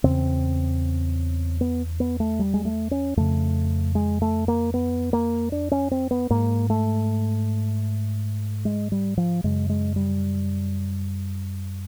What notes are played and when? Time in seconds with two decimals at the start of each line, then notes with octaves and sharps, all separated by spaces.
0.04 E2 C#3 C4
1.61 B3
2.00 B3
2.20 A3
2.39 G3
2.54 G#3
2.65 A3
2.91 C#4
3.17 F2 C#3 A3
3.95 G#3
4.22 A3
4.48 A#3
4.74 B3
5.13 A#3
5.52 D4
5.71 C#4
5.91 C4
6.11 B3
6.30 G#2 A#3
6.70 A3
8.65 G#3
8.92 G3
9.17 F3
9.44 F#2 C#3 G#3
9.69 G#3
9.96 G3